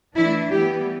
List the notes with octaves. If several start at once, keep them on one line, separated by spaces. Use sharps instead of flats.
E3 A3 D4 E4
E3 G3 B3 G4